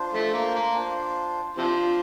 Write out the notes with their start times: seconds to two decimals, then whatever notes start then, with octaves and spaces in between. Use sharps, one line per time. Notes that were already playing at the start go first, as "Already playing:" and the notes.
Already playing: D4 F4 C5
0.13 F3 A3
0.33 A#3
0.54 A#3
0.75 D4 F4 C5
1.57 C3 F3 D4 F4 C5